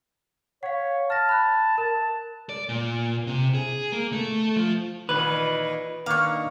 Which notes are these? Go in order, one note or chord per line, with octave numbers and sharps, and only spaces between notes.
C#5 F5 F#5
A5 F6 A#6
B5 F#6
A#4 A5
D5
A#2
C3
G#4
A#3
A3
F3
A#2 D#3 E3 B4
D#3 A#3 D4 F5 C#6